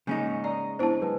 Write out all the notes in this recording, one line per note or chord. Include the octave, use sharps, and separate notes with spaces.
C#3 G#3 A#3 C#4 D#4 C#6
D5 D#5 A#5
B3 D4 E4 C5 A5
G#3 B4 C7